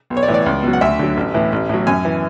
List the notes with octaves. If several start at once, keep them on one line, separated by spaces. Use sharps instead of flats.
B1
C#5
D5
A2 E3
D5
C#2
B2 F#3
F#5
D2 E5
D3 F#3
A1
A2 E3
A1
A2 F#3
F#2 G#5
E3